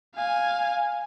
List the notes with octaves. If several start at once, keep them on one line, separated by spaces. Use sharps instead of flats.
F5 G#5